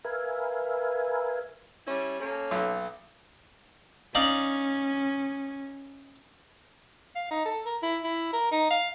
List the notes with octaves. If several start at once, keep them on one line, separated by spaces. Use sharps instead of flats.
A#4 B4 E5 F5 G#5
G3 C#4 E4
A#3 C#4 A4
B1
C#4 D#4 D5 F5
F5
D#4
A4
A#4
E4
E4
A#4
D#4
F5